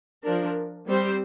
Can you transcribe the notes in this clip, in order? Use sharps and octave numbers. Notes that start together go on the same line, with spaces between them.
F3 D4 A#4
G3 C4 G4 C5